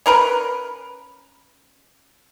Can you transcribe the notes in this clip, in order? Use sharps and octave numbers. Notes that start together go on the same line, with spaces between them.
C#4 A#4 B4